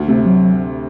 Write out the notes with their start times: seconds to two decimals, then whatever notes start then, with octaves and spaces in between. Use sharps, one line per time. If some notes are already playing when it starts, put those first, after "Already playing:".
Already playing: D2
0.08 C3 A3
0.26 F#3